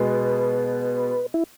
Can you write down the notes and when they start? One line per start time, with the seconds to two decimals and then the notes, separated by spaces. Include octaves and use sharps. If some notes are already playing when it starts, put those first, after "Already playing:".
Already playing: B2 G#3 B3 B4
1.34 E4